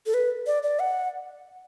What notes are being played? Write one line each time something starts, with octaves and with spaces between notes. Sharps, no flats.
A4
B4
D5
D5
F#5